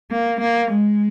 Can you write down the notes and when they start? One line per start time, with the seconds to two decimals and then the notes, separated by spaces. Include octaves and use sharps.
0.11 A#3
0.41 A#3
0.71 G#3